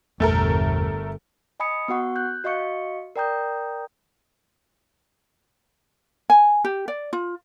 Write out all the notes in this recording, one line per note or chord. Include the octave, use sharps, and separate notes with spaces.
G1 E2 A#2 A3 A4 A#4
D#5 G#5 B5 D#6 C#7
B3 F#4 F#5 C#6
F#6 G6
F#4 D#5 F5 C#6 C#7
A#4 D5 G5 A#5 D#6 G6
G#5
G4
D5
F4